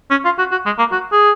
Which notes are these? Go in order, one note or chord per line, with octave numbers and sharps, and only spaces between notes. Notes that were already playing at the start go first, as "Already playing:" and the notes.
C#4
F4
F#4
F#4
G#3
A#3
F#4
G#4